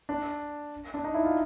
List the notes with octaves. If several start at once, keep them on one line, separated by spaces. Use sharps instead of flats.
D4
D4
D#4
E4
F4